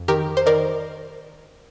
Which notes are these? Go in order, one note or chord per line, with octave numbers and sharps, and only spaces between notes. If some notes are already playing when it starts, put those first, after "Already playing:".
Already playing: F2
D#3 G4 A#4
C5
D#3 A#4 D5